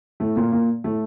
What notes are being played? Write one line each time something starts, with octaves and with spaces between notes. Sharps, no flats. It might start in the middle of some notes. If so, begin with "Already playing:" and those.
A2 A3
A#2 A#3
A#2 A#3
A2 A3